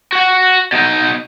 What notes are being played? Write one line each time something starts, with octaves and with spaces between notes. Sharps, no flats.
F#4 F#5
B2 D#4